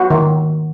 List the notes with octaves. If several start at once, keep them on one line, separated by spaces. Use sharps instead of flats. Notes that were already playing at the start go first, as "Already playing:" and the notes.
Already playing: F#4
D#3